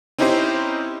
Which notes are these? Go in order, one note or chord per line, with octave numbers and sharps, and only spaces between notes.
C4 C#4 D#4 E4 G4 C5